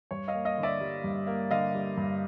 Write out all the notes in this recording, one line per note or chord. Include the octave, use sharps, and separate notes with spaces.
G2 C#5
D#5 F5
A#3
D#5 F5
D3
D5 E5
G3
G2
A#3
D3 D#5 F5
G3
G2